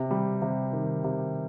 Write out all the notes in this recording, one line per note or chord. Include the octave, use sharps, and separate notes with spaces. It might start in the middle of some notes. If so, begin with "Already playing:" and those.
Already playing: C3
G3
C3
D#3
C3